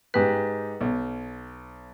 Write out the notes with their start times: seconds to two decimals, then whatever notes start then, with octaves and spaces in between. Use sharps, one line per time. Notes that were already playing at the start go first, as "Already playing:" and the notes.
0.14 G#2 G4 B4 F#6
0.81 B1